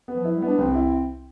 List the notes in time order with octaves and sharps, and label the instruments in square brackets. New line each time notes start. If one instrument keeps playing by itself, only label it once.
[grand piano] B3
[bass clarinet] F3
[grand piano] E4
[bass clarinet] G3
[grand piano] B3
[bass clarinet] D4
[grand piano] C2 [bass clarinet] C4
[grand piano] E4